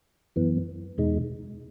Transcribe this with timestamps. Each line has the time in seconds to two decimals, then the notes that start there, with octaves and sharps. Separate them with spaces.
0.36 F#2 E3 B3
0.98 E2 B2 G#3 D#4